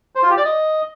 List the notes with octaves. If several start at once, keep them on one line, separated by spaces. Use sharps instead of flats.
C5
F4
G4
D5
D#5